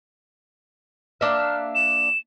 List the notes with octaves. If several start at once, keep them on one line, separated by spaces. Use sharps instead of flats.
A#3 D4 E5 F6
E7